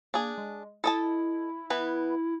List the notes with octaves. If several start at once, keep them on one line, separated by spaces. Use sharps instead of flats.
A#3 D4 G#4
G#3
E4 A4 D#5 A5
E3 B3 B4